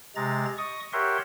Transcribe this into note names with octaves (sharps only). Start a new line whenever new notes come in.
C3 G#3 A#5 A6
D#5 C#6 D#6
G4 A#4 C#5 E5 F#5 C6